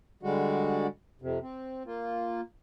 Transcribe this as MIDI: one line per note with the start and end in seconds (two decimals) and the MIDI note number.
0.23 0.87 50
0.23 0.87 55
0.23 0.87 56
0.23 0.87 66
1.22 1.39 41
1.22 1.39 48
1.42 1.83 60
1.86 2.41 58
1.86 2.41 65